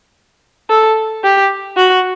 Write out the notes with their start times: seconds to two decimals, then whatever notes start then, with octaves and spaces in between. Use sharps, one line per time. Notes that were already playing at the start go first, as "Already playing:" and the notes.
0.70 A4
1.24 G4
1.77 F#4